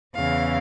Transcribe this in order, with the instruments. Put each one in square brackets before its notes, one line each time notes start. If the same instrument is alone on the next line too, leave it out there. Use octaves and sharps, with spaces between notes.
[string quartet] E2 C#3 E3 F5